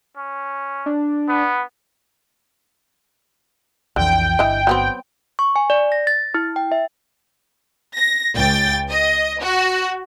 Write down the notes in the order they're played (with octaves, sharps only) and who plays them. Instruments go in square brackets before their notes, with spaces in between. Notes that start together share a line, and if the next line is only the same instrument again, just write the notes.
[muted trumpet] C#4
[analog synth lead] D4
[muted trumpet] B3
[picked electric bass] B1 F2 E3 [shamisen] D3 [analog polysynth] G5
[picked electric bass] G1 [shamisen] E3 D#5
[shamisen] F#3 B3 C4
[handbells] C#6
G#5
D5
A#6
A6
E4
G5
E5
[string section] A#6
C#2 G5 A6
D#5
F#4